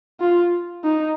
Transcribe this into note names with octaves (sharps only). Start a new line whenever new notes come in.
F4
D#4